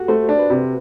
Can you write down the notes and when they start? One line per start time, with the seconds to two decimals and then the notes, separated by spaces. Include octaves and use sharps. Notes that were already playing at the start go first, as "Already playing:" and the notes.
Already playing: F#4 G4 A4
0.08 A3 C5
0.29 D4
0.39 B4
0.50 C3